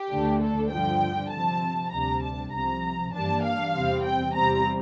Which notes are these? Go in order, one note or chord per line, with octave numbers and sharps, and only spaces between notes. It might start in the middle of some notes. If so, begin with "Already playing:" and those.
Already playing: G4
D2 D3 A3 D4
A4
G2 D3 F3 G5
C3 F3 C4 A5
D2 C3 G3 D4 A#5
A5
C2 C3 F3 A#5
G2 E3 G3 A#3 D4 A5
F5
E2 C3 G3 C4
G5
E2 C3 G3 C4 A#5